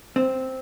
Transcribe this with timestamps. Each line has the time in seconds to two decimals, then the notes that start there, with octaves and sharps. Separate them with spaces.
0.16 C4